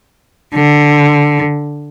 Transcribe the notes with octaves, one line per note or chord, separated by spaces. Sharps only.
D3